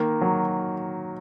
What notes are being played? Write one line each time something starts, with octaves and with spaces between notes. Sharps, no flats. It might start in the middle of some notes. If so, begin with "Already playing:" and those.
Already playing: D#3 A#3
F#3